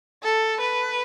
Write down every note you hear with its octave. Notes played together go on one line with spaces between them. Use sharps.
A4
B4